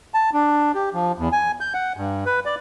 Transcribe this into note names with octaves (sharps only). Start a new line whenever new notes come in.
A5
D4
G4
F3
E2
G#5
G6
F#5
G2
B4
D5